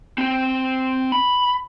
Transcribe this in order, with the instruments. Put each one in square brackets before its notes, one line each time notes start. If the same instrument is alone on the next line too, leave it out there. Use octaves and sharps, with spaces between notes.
[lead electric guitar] C4 C5
B5